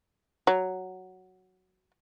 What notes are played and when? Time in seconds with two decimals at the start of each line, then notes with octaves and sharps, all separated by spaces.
0.47 F#3